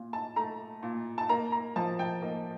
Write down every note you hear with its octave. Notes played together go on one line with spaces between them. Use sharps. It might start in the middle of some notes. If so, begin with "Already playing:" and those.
Already playing: A#2
A5
A3 A#5
A#2
A5
A#3 A#5
A#5
F3 A5
G5
A#3 D#5